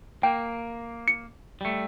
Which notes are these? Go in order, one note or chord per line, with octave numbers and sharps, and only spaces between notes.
A#3 G5
C#7
G3 A3